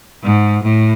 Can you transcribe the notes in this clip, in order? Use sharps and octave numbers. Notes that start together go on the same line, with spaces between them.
G#2
A2